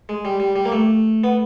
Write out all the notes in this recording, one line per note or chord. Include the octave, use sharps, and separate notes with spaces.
G#3
G3
G3
G3
A#3
A3
B3